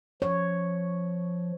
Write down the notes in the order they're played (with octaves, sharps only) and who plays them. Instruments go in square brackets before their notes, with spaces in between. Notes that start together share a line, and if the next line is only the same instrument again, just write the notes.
[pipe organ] F3 [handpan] C#5